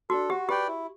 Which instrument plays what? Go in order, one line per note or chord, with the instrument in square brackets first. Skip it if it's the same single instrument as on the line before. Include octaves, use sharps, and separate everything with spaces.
[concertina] D4 A4 [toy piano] F#4
[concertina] F#4 [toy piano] G4
[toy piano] G4 [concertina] B4 D5 G5
[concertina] E4